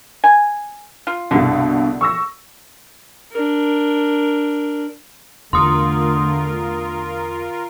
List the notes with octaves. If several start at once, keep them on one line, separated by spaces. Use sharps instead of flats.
G#5
F4
C2 G2 B2 D3
C#6 E6 A#6
D4 A#4
E2 D3 A3 F4 A#4 C6 D#6